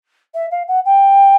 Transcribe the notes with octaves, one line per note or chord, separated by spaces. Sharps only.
E5
F5
F#5
G5